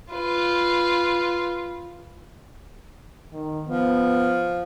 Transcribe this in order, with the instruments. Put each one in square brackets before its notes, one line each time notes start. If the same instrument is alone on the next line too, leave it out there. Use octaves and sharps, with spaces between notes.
[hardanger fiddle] F4 B4
[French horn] D#3
[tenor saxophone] F3 [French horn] B3